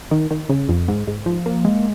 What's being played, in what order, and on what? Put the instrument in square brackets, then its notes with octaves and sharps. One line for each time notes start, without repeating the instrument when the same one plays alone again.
[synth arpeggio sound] D#3
D#3
C#3
F2
G#2
G#2
F3
A#3
G#3